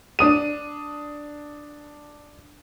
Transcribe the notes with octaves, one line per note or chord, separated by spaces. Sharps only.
D4 D#6 D#7